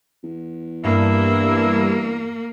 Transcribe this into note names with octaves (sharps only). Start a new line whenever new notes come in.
E2
G2 A#3 E4